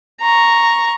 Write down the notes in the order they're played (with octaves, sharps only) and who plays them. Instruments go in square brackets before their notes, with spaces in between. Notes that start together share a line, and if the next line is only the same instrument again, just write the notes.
[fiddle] A#5 C#6